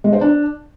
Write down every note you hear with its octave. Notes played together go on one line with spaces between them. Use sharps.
G#3
C5
D4